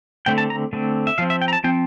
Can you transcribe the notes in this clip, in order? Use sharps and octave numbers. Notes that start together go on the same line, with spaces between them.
D3 A3 C4 G5
A5
A#5
D3 A3 C4
E5
F3 C4 F5
E5
G5
A#5
A5
F3 C4 G5